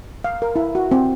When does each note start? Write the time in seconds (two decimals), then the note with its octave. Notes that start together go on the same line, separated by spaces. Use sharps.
0.24 F5
0.42 A#4
0.56 E4
0.75 F#4
0.91 C4